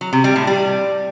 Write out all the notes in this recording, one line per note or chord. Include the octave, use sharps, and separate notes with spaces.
F#3
C3
G3
A2
G3